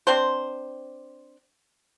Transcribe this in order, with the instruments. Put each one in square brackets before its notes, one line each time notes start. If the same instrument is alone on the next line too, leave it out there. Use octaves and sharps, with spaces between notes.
[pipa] C4 D4 C5